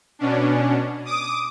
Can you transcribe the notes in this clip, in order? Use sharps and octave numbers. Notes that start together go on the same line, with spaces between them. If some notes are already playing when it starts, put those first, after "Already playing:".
B2 C#4 D4
D6 D#6